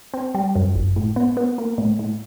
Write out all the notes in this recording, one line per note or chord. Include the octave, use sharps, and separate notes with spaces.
C4
G3
F#2
G1
A2
B3
B3
A#3
A2
A2